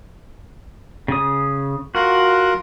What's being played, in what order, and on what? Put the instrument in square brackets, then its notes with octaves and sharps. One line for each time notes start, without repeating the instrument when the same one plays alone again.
[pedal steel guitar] C#3 D#6
[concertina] F4 A#4 [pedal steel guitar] F#4